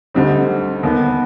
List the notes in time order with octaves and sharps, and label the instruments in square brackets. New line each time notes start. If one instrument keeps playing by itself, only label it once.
[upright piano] D2 D3 G3 C4 D#4
D#2 D#3 B3